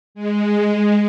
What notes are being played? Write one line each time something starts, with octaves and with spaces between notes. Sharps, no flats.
G#3